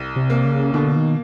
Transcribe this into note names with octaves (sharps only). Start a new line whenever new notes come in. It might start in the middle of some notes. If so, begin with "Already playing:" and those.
Already playing: C2
C3
A#3
C#3
B2 D3
D#3